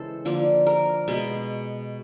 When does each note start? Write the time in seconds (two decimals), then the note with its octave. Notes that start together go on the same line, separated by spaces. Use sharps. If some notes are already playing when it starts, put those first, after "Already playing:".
Already playing: C#3 E3 G#3 A4 C5
0.25 D3 F3 A#3
0.67 A#4
1.08 B2 G#3 B3